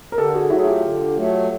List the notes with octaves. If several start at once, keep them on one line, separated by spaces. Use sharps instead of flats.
A#4
D3 G4 A4
F#4 G#4
F#3 A3 E4 F#4
G#4
F4 G4
D3
F#3 A3